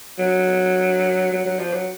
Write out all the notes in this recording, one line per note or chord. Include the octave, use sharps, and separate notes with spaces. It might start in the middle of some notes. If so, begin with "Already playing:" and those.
F#3
F#3
F#3
F3
F#3